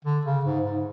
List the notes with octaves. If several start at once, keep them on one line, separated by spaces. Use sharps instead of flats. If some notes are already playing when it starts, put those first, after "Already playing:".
D3
C#3
G#2
G#2